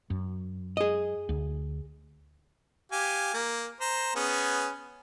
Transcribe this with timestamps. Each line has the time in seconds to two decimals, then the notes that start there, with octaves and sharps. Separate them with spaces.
0.10 F#2
0.77 G#4 D#5
1.29 D2
2.92 G4 F5 G#5
3.34 A#3
3.81 C5 A#5
4.16 B3 C#4 G#4